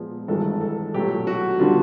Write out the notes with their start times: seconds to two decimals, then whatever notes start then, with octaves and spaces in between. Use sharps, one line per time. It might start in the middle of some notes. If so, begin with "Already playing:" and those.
Already playing: A#2 F3 G#3 B3
0.28 G#1 G2 E3 G#3 A4
0.61 A4
0.94 B1 A#2 F#3 A3 G4
1.27 F#4
1.60 D3 G3 B3 D4 F4